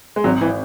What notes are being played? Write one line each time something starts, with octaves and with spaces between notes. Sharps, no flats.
G#3
G#1 F#3
E3